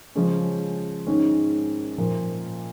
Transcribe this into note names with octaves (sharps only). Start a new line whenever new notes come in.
C#3 F3 G#3 C#4
G#2 D#3 G#3 C#4
A#2 F3 A#3